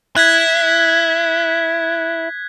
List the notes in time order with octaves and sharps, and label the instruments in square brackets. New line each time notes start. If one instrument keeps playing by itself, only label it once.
[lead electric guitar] E4 [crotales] F#6 G#6 B6